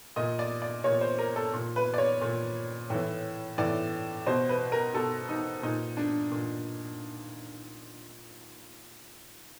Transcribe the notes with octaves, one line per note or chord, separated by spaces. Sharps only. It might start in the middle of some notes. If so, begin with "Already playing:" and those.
A#2 D#5
D5
D5
A#2 C#5
C5
A#4
A4
A#2
B4
D5
C#5
A#2
A2 E3
A2 E3 D5
B2 C5
B4
A#4
B2 A4
D#4
A#2 D#4
D4
A#2